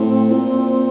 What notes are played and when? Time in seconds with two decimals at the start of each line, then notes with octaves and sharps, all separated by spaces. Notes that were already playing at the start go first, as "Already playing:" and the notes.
Already playing: A2 C4
0.31 A#2